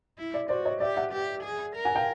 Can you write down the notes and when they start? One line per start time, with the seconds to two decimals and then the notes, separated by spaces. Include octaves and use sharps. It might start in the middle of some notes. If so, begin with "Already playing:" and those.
0.18 E4
0.34 D5 E5
0.49 F#4 C5 D5
0.65 C#5 D#5
0.80 G4 D5 E5
0.96 E5 F#5
1.12 G4
1.44 G#4
1.76 A#4
1.85 F#5 G#5
1.96 F5 G5